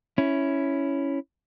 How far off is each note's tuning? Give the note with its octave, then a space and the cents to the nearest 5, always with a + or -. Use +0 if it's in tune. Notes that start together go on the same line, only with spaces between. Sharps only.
C#4 +0 E4 +0